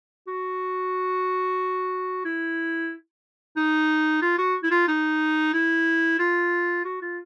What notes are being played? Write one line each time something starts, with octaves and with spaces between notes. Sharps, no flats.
F#4
E4
D#4
F4
F#4
E4
F4
D#4
E4
F4
F#4
F4